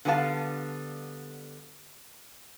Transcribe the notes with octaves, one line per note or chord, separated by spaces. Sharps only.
D3 G3 B3 G4 F5 A5